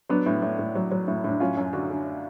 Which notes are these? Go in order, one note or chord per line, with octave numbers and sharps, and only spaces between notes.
F#3 B3 D4
A2
A2
A2
F#3
F#3
A2
A2 D4
F#3 C#4 F4
F#2
D3 D4 F#4
D3